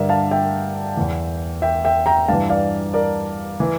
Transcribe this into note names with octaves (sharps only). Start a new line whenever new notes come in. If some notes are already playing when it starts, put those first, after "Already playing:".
Already playing: G2 D3 A#4 D5 E5
F5 A5
E5 G5
E2 E3
E5 G5
E5 G5
G5 A#5
G2 E3 F5 A5
D5 F5
A#4 D5
E3